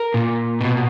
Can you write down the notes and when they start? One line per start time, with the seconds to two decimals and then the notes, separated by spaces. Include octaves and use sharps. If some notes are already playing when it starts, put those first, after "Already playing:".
Already playing: A#4
0.14 A#2
0.61 B2